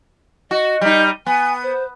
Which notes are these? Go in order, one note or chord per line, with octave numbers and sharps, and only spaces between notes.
F#4 D#5
G3 D#4
B3 G#5
C5